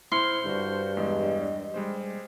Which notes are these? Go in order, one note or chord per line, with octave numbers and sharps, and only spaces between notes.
E4 C5 C6 F6 C#7
G2 D3 F#4
E2 G#3 D#5
G3 G#3 C5